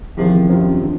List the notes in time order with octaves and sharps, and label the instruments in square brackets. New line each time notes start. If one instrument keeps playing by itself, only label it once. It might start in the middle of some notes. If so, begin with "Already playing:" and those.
[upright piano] E2 C3 D#3 [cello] F3
[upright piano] F#2 D#3 G3 C4 F4
D3